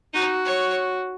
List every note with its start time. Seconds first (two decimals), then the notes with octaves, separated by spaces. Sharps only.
0.14 D#4 F#4
0.45 C#5